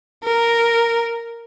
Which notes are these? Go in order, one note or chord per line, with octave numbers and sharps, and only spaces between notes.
A#4